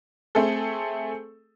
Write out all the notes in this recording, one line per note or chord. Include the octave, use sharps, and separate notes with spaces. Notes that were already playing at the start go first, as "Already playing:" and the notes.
A3 C4 G#4 A4